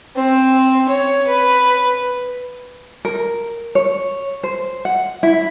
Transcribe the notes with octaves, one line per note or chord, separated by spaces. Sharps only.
C4
C#5
B4
A#4
C#5
C5
F#5
E4